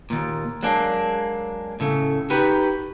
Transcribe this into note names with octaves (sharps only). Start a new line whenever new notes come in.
D#2 A#2
F#3 G#3 A#3 D4
A2 C#3 A3
D#4 F#4 G4 B4